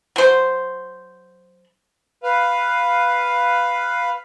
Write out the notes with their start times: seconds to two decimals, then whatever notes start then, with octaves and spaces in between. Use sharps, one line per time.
0.16 F#3 C5
2.23 B4 F5